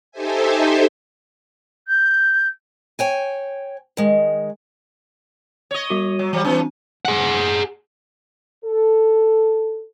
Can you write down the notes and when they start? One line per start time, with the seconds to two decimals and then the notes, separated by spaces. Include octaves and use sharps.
0.12 D#4 G4 A4 C5 E5 G#5
1.88 G6
2.99 C#5 G5 G#5
3.97 D#3 G#3
5.71 C#5 D#5
5.90 G3 F#4 D#7
6.19 F#3
6.33 E3 F3 G3
6.45 E3 A3 C4 D4
7.05 G#4 F#5
8.65 A4